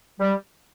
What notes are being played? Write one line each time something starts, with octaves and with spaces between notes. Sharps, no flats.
G3